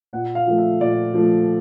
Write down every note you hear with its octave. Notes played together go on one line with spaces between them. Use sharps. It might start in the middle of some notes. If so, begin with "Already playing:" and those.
A#2 F#5
F5
F3 A3
E5
A#2 D5
F3 A3